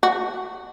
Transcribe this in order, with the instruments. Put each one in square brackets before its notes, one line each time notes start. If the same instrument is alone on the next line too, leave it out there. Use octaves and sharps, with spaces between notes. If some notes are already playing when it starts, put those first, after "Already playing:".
[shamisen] F#4